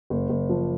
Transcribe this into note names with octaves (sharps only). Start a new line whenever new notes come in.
F#1
F#1
F3